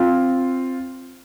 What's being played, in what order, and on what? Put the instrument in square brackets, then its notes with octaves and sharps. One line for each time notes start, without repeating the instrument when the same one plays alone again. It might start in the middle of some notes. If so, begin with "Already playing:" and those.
Already playing: [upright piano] C4 F4